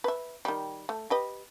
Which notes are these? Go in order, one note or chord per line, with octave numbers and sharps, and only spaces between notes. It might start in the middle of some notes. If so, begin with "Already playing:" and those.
B4 E5
D#3 G3
A3
G4 B4 D#5